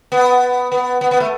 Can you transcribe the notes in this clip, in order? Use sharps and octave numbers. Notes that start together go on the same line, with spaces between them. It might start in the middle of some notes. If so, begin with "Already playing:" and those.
B3
B3
B3
B3
A3